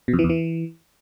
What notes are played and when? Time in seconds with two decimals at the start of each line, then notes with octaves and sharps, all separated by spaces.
0.08 B2
0.13 F2
0.19 E3
0.24 E2
0.29 E3